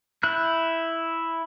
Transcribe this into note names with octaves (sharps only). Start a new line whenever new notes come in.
E4 F#6 G6